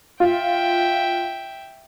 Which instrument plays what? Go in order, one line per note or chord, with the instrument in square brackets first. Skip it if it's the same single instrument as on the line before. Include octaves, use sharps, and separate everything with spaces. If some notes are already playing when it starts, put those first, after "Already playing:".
[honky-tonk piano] F4 [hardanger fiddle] E5 G5